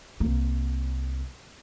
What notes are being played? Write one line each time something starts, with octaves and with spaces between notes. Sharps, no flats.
C2 A#3